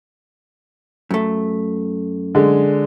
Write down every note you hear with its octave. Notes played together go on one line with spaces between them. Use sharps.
F#2 A3
D3 G#3